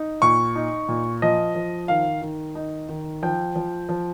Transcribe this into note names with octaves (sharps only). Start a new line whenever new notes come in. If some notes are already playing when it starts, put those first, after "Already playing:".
Already playing: D#4
A#2 C#6
D#4
A#2
F3 D#5
F3
D#3 F5
D#3
D#4
D#3
F3 G5
F3
F3